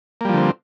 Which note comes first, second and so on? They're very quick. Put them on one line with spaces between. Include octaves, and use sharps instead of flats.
A#3 G3 F3 D3 C4